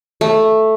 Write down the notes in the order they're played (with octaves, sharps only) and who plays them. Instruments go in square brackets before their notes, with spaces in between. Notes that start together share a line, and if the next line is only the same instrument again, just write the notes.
[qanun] A3